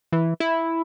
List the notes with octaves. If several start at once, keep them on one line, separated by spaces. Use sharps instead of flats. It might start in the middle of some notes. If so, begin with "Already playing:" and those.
E3
E4